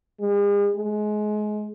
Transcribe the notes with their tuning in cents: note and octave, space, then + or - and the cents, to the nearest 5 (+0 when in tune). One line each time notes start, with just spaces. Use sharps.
G#3 -45
G#3 +25